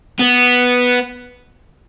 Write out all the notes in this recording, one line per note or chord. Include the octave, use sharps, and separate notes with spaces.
B3